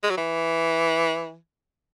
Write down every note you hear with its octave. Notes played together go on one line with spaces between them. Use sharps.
G#3
F#3
E3